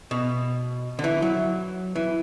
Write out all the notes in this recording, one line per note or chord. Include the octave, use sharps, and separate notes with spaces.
B2
D3
E3
F#3
E3